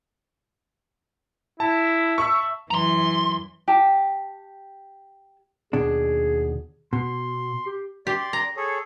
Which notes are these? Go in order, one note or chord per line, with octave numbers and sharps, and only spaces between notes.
E4 A5
E5 B5 C#6 E6
F#2 E3 A#5 C6
G4 A5
D#2 B2 D4 G#4
B2 C6
G4
G4 D5 C6
A#5
G#4 A4 C#5